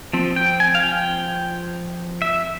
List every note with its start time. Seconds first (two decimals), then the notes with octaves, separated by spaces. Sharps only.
0.13 F3 C4
0.36 G5
0.60 G#5
0.75 F5
0.83 G5
2.22 E5